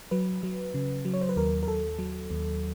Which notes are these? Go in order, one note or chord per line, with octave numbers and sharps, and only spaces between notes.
F#3 B4
F#3
C#3
F#3
C#5
C5
B4
D#2 A#4
A#4
D#2 A4
F#3
D#2